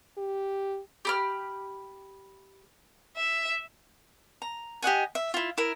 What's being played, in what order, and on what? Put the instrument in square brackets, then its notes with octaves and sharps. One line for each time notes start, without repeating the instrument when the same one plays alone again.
[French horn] G4
[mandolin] G4 B5 F6
[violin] E5
[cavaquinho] A#5
G4 D#5 F#5 G#5
E5
E4 F4
E4 A#4